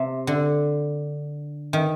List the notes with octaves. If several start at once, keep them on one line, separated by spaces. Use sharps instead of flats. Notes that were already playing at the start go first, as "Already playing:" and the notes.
Already playing: C3
D3
D#3